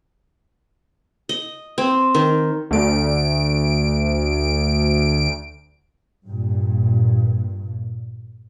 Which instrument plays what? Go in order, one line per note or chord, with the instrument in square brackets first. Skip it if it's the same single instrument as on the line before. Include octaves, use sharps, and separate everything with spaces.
[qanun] D#5
C4
D#3
[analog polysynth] D2 D7
[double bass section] G2 A#2